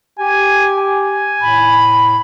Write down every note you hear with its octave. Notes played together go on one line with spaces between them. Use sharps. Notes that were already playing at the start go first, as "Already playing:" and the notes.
G4 G#5
G#5
A2 B5